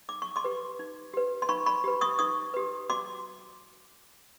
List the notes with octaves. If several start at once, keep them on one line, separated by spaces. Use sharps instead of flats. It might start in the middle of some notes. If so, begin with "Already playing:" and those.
D#4 D6
C#6
C6 D6
G4 B4
D#4
G4 B4
C6
D#4 B5 C#6
B5 C#6
G4 B4
C#6 D#6
D#4 C#6 D#6
G4 B4
F#4 C6 D6